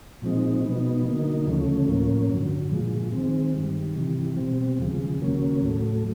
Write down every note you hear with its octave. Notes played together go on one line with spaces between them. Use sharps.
A#2 F3 G#3 C4 D#4
B2 F#3 B3 D#4
D3 F#3 A#3 D#4
D2 C#3 F3 A3 C#4
A2 F3 A#3 C#4
G2 D3 F#3
A#2 F3 G#3
D#3 G#3 C4
G2 D#3 G3
C3 E3 G3
B2 G3 C4
D#2 C#3 F3 G#3
D#2 C#3 F#3 A#3 C#4
A2 F#3 A3